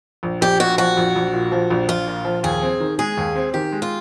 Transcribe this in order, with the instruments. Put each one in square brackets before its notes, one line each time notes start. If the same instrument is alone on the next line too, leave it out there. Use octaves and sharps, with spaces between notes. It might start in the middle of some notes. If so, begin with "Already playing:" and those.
[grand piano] A#1
[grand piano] A#1 [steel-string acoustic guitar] G4
[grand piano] A#2 [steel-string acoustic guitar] F#4
[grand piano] F3 [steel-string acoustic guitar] F#4
[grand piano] A#1
A#1
A#2
F3
A#1
[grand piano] A#1 [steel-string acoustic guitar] F4
[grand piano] A#2
F3
[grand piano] D#2 [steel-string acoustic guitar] G#4
[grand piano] C4
D#3
[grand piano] G#3 [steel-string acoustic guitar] G#4
[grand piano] D#2
C4
[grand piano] D#3 [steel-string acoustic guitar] G4
[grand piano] G#3
[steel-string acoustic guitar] F4